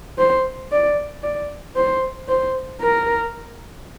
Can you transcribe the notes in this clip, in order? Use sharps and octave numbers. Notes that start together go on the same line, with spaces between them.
C5
D5
D5
C5
C5
A#4